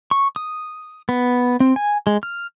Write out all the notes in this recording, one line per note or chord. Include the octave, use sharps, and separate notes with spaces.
C#6
D#6
B3
C4
G#5
G#3
F6